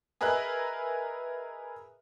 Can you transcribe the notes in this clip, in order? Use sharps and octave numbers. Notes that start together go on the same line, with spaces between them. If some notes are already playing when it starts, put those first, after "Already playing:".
G#4 A#4 B4 D#5 E5 F#6